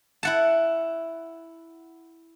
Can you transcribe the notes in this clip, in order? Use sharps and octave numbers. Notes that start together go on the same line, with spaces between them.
E4 F#5 A5